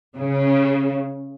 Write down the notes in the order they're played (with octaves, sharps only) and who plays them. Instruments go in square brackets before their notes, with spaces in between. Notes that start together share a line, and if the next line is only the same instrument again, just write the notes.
[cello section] C#3